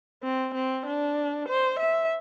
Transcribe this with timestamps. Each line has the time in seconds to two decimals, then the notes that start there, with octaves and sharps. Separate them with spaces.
0.24 C4
0.55 C4
0.86 D4
1.49 C5
1.80 E5